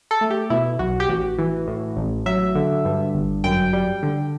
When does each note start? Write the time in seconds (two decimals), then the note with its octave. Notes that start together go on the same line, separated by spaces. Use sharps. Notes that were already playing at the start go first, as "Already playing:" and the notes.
0.11 A4
0.21 A3
0.30 G4
0.50 B2 E4
0.79 B1 F#4
1.00 G4
1.08 A1 F#4
1.38 E3
1.67 A2
1.97 A1
2.26 F#3 E5
2.55 D3
2.85 G2
3.14 G1
3.44 F#2 G5
3.73 G3
4.03 D3